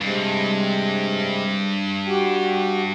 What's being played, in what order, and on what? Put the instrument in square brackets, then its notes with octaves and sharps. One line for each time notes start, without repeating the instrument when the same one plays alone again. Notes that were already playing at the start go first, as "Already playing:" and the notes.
[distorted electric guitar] G2 [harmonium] C3 G#3
[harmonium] F#4 G4 G5